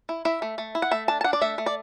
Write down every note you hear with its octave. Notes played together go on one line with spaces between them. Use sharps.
E4
E4 E5
A3
A3
E4
F#5
A3 E5
D4 A5
A5
D4 F#5
D5
A3 E5
A3
D5